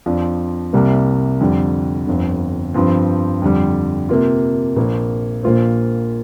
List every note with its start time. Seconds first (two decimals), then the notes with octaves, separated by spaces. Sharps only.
0.06 F2 F3 D4
0.73 C2 C3 G3 A#3
1.41 F2 D3 G3
2.07 G1 F2 D3
2.74 G2 F3 C4
3.42 F2 D3 G3
4.09 C3 A#3 F4
4.76 A#1 A#2 A#3
5.43 A#1 A#2 A#3 F4 C5